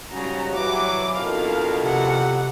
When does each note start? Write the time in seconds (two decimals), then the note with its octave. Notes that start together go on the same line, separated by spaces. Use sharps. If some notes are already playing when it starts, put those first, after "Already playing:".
0.12 G#2 C#3 G3 F#4 A#5
0.54 E3 F#3 D6
1.15 F2 B2 D4 E4 A#4 F5
1.84 C3 F#5